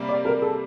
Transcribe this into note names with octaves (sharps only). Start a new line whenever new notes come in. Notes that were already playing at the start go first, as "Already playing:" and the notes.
Already playing: C3 G3 A#3
D5
A#4
A4